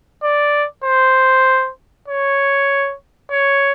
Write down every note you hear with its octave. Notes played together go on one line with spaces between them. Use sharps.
D5
C5
C#5
C#5